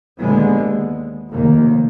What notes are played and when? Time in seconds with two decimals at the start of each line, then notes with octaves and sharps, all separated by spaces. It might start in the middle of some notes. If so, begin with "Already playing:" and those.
0.19 D#2 D3 G#3 B3
1.30 F1 D#2 D#3 A#3